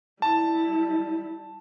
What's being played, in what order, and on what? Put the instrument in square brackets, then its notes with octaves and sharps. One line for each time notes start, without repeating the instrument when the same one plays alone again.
[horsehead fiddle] G3 E4 [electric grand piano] A5